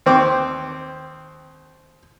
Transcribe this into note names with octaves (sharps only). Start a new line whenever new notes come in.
D#2 C4 D6